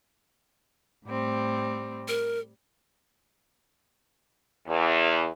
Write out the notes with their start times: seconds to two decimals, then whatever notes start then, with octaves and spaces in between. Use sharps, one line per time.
1.06 A2 G3 C4
2.08 A#4
4.68 E2